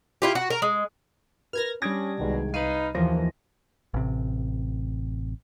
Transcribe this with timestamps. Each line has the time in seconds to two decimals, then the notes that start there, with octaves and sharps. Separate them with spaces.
0.22 E4 F4 G4
0.35 F#4
0.50 A#4
0.62 G#3
1.53 A#4 B4 F6 G#6 A#6
1.82 G3 C#4 D4 D#6 G#6 A#6 D7
2.19 C2 B2 D#3 G#3
2.54 D#4 B4 F5 D#7
2.95 D#2 E3 F3 A#3 C5 A#6
3.94 A1 C3